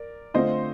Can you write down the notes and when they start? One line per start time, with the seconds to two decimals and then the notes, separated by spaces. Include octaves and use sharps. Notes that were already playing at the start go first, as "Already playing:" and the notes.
Already playing: A#4 D5
0.34 D3 A3 C4 F4 C5 D#5